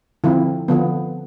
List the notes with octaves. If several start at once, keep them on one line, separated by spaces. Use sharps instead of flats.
D3 F3 C4 E4
D3 F3 B3